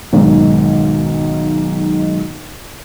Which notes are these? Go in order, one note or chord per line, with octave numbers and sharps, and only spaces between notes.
B1 G#2 D#3